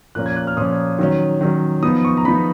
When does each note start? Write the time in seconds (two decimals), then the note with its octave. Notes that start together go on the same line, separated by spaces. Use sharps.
0.15 A#2 F3 A#3 C#4 F#6
0.26 G#6
0.36 F#6
0.47 F6
0.57 A#2 F3 A#3 C#4 D#6
0.99 D#3 F#3 C#4
1.41 D#3 F#3 C#4
1.83 F3 B3 D#4 D#6
2.05 C#6
2.17 A#5
2.25 F3 B3 D#4 B5